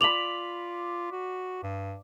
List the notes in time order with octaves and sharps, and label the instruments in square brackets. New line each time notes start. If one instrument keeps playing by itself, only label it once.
[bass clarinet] F4 [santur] D5 B5 [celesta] F7 F#7
[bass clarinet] F#4
G2